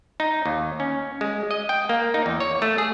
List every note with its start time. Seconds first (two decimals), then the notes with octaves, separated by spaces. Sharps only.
0.20 D#4
0.46 D#2
0.80 C#4
1.21 G#3
1.51 D#5
1.69 G5
1.89 A#3
2.14 D#4
2.26 E2
2.40 C#5
2.62 A3
2.78 G#4